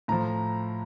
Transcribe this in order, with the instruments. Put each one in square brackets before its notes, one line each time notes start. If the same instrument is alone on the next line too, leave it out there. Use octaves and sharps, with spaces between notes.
[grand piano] A2 F3 A#5